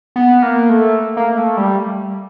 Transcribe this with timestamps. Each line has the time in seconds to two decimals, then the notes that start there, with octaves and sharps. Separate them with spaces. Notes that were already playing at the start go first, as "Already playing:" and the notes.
0.16 B3
0.42 A#3
0.69 A3
1.17 A#3
1.37 A3
1.57 G3